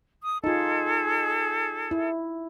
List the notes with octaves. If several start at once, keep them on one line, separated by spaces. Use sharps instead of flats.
D#6
D#4 F4 G#4 A4
E4